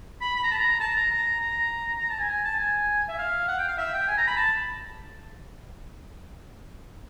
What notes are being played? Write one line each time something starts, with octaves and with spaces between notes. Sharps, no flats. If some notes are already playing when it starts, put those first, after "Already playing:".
B5
B5
A#5
A5
A#5
A5
A#5
A#5
A#5
A#5
A5
G#5
G#5
A5
G#5
E5
F5
F#5
G5
F5
E5
G5
G#5
A#5
B5
A5